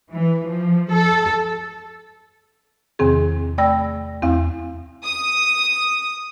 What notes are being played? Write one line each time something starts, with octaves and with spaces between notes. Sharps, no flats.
E3
F3
A4
E2 C3 D#3 C4 G#4
A3 D5 G5 B5 E6 A#6
E2 C4 E4 F5
D#6